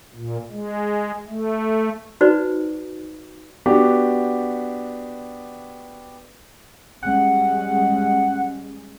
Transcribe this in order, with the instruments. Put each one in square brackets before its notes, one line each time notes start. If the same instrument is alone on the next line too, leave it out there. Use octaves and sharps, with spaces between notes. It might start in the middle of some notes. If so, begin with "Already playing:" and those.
[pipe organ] A#2
G#3
A3
[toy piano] D#4 F#4 B4 C5 D5
[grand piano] B3 D4 F#4 G4
[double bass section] G3 G#3 C#4 [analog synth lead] F#5